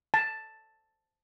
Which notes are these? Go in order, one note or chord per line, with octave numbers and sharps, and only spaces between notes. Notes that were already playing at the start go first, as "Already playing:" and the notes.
A5